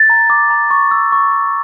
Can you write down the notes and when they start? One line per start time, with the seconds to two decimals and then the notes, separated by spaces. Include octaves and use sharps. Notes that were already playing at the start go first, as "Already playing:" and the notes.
Already playing: A6
0.10 A#5
0.30 D6
0.50 A#5
0.71 C#6
0.91 E6
1.12 C#6
1.32 C#6